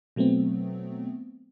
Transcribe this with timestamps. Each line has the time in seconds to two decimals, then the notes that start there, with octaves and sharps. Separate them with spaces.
0.16 B2 F#3 A3 B3 C4